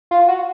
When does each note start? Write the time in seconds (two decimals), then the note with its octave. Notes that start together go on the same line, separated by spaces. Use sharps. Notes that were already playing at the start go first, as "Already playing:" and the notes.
0.11 F4
0.28 F#4